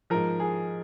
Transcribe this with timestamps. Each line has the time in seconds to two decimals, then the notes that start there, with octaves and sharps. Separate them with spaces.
0.10 G#2 F3 A#4
0.40 G#4